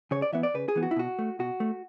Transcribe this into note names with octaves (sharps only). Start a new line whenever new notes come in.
C#3 C#5
D5
E3 B3 E5
D5
C#3 B4
G#4
E3 B3
F#4
E4
B2 F#4
A3
B2 F#4
A3